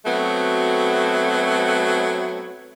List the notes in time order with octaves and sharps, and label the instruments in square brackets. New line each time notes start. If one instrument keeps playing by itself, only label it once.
[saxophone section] F#3 A3 B3 C4 F#4